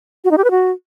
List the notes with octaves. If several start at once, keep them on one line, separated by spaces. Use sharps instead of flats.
F#4
D#4
G4
B4
F#4